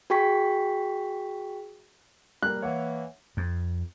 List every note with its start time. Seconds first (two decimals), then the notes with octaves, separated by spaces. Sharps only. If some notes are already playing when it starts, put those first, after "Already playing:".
0.10 F#4 G#4 G5 C#6 B6
2.43 G3 A#3 A#4 F#6
2.62 E3 A#3 C#5 E5 F#5
3.37 F2